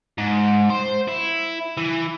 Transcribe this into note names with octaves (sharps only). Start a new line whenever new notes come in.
G#2
C5
E4
E3